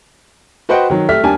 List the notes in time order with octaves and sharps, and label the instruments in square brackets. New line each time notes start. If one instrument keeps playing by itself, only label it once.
[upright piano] F#4 B4 C5 D#5 F#5 G5
D#3 F#3
G3 A3 E5 F6 B6
D#2 G3 D4 G#5 A5